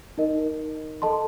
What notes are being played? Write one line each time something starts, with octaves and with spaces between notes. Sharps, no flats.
D#4 A#4 D#5
A4 D#5 A5 C6